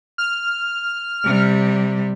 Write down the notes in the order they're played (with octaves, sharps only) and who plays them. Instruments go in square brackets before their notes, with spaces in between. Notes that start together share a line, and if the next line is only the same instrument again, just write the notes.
[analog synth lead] F6
[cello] C3 G3